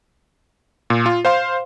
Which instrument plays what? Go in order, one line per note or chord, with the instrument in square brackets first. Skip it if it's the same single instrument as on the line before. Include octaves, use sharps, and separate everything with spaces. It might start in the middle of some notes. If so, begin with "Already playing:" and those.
[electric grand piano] A#2
F4
C5 F5 C6